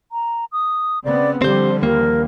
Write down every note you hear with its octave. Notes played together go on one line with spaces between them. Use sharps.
A#5
D#6
C#3 B3 C4 D5
D3 F3 G3 C4 G4 C5
D#2 A#3 A#4